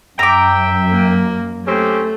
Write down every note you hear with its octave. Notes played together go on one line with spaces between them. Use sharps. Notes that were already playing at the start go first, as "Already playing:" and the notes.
F#2 E5 G5 A#5 D6
A#3
A3 C4 C#4 G4